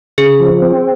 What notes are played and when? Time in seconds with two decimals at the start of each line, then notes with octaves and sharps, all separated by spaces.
0.18 C#3 G#4
0.40 F3
0.62 C4